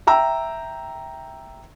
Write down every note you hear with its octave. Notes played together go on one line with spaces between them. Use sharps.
E5 G5 A#5 E6